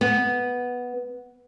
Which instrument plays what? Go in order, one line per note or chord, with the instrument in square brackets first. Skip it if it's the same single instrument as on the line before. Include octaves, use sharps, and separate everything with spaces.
[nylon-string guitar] B3